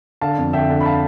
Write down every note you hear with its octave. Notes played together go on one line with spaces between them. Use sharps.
D3 F5 A5
F2
D3 E5 G5
D3
B5
F5 A5